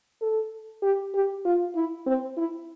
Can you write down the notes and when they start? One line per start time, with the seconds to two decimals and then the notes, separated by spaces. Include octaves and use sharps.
0.21 A4
0.82 G4
1.14 G4
1.45 F4
1.75 E4
2.06 C4
2.37 E4